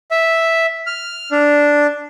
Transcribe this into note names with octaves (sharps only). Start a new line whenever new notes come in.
E5
F6
D4